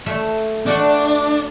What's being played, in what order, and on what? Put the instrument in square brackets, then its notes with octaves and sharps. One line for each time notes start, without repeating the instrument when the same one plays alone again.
[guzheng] A3 A4
[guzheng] A3 F#4 D5 [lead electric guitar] D4